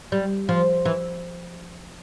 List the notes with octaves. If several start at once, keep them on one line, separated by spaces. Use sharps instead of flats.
G3
F3
E3